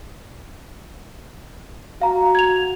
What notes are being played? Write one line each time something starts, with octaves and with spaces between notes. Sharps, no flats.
F#4 F5 A#5
G#6 F7